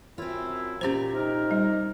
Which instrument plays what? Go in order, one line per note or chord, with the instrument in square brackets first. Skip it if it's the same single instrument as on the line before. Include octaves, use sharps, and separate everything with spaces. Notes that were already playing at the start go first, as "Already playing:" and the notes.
[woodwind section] F#2 E4 [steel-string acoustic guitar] C4 F4
[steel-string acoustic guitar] A#2 G4 A#5 [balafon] C#4 C5
[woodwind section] C3 A#4 [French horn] D#4
[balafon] G3